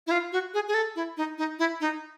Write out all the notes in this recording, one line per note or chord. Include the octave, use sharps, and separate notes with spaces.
E4
F4
F#4
G#4
G#4
A4
E4
D#4
D#4
E4
D#4